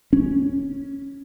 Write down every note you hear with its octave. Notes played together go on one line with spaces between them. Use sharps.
C#4